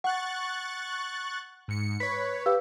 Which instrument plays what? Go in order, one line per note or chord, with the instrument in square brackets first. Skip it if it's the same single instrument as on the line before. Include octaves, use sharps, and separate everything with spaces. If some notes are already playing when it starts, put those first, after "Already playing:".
[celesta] F#5 [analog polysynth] C#6 F#6 A6
[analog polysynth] G#2 C#7
[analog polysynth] B4 C#5 [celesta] B6
[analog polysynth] G4 [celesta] B4 F5 E6